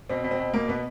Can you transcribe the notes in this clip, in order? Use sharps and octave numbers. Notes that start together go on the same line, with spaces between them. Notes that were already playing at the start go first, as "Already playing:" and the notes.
B2 C4
B2
C4
B2
B2 A#3
B2 B3